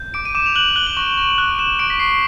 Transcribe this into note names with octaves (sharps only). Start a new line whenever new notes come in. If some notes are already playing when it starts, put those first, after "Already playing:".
Already playing: G6
D6 D7
D#7
D6 E7
F7
F#6 F#7
F#6 G7
F#7
C#6 G7
C#6
F#6 F#7
F#6 E7
C#6 D7
B6
C#6 C7